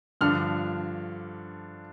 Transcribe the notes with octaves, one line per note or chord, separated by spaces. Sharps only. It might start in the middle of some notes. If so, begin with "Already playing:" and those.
G2 D3 F3 F6